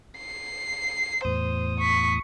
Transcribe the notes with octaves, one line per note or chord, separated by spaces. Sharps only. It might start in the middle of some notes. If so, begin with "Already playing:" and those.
C7
E2 A2 C5 D#6
C#6 B6